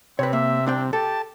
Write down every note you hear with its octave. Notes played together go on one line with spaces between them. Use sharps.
C3 C4 B4 C#5
A#3 E5
C2 C4 D4 G5
G4 A4 A5